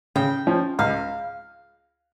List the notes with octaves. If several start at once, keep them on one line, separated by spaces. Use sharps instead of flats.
C#3 G5
F3 C#4
C#2 F5